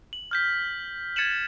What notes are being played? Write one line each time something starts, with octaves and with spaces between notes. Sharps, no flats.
F#7
F6 G6 B6
G#6 A6 C#7 D#7 E7 F#7